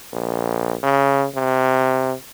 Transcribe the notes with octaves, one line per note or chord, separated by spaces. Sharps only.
A#1
C#3
C3